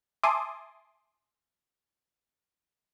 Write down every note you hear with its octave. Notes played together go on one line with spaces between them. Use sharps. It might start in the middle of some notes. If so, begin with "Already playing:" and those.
E5 G#5 A5 C6 D6 D#6